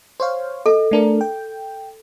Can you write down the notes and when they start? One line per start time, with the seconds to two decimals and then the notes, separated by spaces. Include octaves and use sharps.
0.20 C5 C#5 F5
0.66 A4 D#5
0.91 A3 D4 A#4
1.21 G5